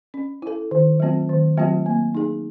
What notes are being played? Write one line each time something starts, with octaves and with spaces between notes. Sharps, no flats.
C#4
E4 A4
D#3
F#3 A3 C4 F4
D#3
F#3 A3 C4 F4
A#3
D#4 G#4